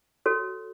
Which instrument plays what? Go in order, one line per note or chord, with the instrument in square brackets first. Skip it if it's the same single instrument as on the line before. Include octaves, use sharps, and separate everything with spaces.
[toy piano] F#4 A4 C#5